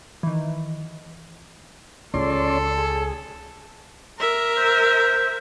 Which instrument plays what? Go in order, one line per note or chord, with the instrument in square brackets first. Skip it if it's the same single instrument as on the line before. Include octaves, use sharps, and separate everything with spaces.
[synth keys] D#3 E3
[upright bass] C#2 [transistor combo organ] C#4 D5 C6 [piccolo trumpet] A4
[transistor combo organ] G#4
[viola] A#4 E5
[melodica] C5